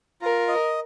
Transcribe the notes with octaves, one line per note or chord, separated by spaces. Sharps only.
F4 A#4
D#5